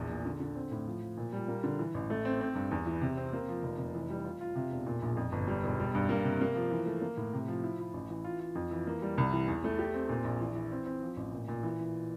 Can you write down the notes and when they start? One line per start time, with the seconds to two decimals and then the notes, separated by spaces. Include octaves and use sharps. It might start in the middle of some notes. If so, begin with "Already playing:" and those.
Already playing: A#1 E2
0.10 A#2
0.25 D3
0.40 D3
0.55 C4
0.72 A2
0.87 F3
1.02 F3
1.17 A#2
1.33 G3
1.48 A#3
1.64 D3
1.79 E3
1.94 A1
2.10 A3
2.25 C4
2.41 C4
2.55 G2
2.71 E2
2.86 E3
3.01 C3
3.17 C4
3.33 A#3
3.48 F3
3.63 F1
3.78 F1
3.95 E3
4.10 G3
4.24 F4
4.41 F4
4.56 C3
4.71 E1
4.86 A#2
5.02 A#1
5.17 F2
5.32 G1
5.47 G3
5.63 E1
5.79 G3
5.95 G2
6.09 A#3
6.24 C3
6.41 A#3
6.56 F3
6.71 E3
6.86 A3
7.02 A#3
7.17 A2
7.33 C3
7.48 F3
7.63 E4
7.79 E4
7.94 A1
8.10 E3
8.24 F4
8.40 F4
8.55 F2
8.71 E3
8.87 A#3
9.02 G3
9.18 C2
9.32 E3
9.48 E2
9.64 A3
9.79 G4
9.94 C4
10.09 A#2
10.24 A#1
10.40 E3
10.55 E3
10.72 C4
10.86 C4
11.02 F3
11.17 A1
11.32 A#2
11.48 A#2
11.63 E3
11.80 E3